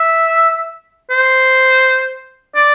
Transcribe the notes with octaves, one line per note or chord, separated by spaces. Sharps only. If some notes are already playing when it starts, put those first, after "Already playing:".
Already playing: E5
C5
D5